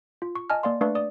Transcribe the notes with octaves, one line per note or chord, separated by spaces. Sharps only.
F4
C#6
D#5 G#5 A5 F6
A#3 D5 F5 C6
A3 D4 B4 D5 F5 C#6
D5 D#6